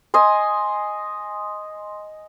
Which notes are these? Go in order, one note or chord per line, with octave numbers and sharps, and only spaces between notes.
D#5 G#5 C6